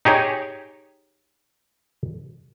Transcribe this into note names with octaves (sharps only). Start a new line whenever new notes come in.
D#4 G4 G#4 C#5